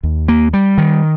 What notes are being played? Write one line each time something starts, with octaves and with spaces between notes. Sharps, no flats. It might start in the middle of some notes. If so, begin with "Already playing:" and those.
D#2
A#3
G3
D#3